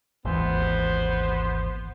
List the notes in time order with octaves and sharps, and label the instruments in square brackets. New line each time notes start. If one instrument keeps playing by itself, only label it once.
[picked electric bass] G#1 D#2 E3 [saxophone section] B3 C5